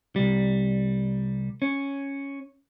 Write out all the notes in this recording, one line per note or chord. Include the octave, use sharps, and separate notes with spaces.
C2 G3
C#4